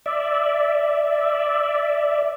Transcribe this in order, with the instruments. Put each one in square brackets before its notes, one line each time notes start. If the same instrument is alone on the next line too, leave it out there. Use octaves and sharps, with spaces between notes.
[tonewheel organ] D5 E5